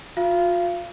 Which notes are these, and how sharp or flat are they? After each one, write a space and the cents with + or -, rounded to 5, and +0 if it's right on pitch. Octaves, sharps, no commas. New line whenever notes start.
F4 +40 F5 -30